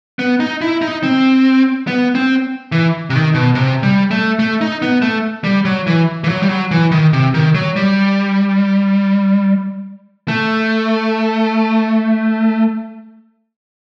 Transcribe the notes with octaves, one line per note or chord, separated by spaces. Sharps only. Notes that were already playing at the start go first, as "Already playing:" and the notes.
B3
D#4
E4
D#4
C4
B3
C4
E3
C3
D#3
B2
C3
G3
A3
A3
D#4
B3
A3
G3
F#3
E3
E3
F#3
G3
F#3
E3
D#3
C3
D#3
F#3
G3
A3